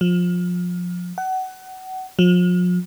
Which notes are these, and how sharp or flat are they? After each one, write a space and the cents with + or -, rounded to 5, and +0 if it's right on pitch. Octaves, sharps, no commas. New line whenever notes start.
F3 +25
F#5 +25
F3 +40